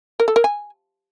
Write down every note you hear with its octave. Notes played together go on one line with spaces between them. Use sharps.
A#4
A4
A#4
G#5